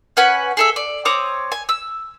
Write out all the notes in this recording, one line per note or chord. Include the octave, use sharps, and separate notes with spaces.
C#4 B4 F#5 G#5
G#4 A4 E5
D5
C4 C#5 D6 D#6
G#5
E6